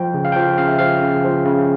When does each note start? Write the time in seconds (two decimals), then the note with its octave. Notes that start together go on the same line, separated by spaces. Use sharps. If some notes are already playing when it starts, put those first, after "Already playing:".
Already playing: F3 G5
0.14 C#3
0.25 F5
0.32 G5
0.36 F3 F5
0.58 C#3 F5
0.68 E5
0.79 F3 F5
1.01 C#3
1.24 F3
1.45 C#3